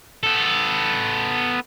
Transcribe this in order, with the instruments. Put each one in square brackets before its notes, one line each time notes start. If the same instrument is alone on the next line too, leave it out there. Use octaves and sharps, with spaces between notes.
[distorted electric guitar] B3 A4